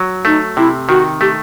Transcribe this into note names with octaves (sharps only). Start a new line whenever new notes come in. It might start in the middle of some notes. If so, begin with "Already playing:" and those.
Already playing: F#3
A3 D#4
C3 E4
D#3 F#4
A3 G4